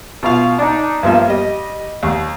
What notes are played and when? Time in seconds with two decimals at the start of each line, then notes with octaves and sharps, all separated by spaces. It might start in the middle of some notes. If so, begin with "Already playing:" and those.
0.23 B2 F4 F5
0.59 D4 D#4
1.03 G2 F3 A#3 E5
1.28 G3 D#5
2.03 D#2